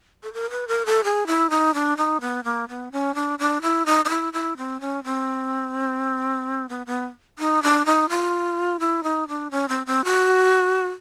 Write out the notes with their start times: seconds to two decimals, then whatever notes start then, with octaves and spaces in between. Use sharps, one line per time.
0.23 A4
0.33 A#4
0.50 B4
0.68 A#4
0.86 A4
1.04 G#4
1.27 E4
1.50 D#4
1.74 D4
1.97 D#4
2.21 B3
2.44 A#3
2.69 B3
2.92 C#4
3.15 D4
3.39 D4
3.62 E4
3.86 D#4
4.05 D#4
4.09 E4
4.33 E4
4.57 C4
4.81 C#4
5.04 C4
6.69 B3
6.86 B3
7.39 D#4
7.63 D4
7.86 D#4
8.09 F4
8.80 E4
9.03 D#4
9.28 D4
9.51 C#4
9.68 C4
9.86 C4
10.05 F#4